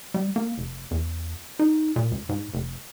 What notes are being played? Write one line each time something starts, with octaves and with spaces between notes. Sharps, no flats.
G3
A#3
F1
E2
D#4
A#2
C#2
G#2
F1